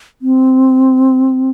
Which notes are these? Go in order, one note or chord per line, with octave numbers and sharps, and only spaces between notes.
C4